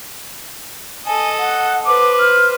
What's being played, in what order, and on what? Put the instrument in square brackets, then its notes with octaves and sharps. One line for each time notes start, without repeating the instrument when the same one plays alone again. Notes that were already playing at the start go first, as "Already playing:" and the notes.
[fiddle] A4 D#5 [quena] G#5
[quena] F#5
[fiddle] B4 C5 [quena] D6
[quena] F6